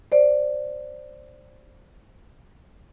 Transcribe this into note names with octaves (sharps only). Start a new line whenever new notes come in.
C5 D5